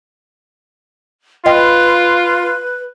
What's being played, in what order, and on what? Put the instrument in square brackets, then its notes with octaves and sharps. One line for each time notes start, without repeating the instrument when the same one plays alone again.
[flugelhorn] F4 [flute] B4 [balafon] D#5 G5